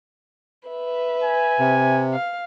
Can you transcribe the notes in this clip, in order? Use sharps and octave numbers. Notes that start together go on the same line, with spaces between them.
B4 E5
G#5
C3
F5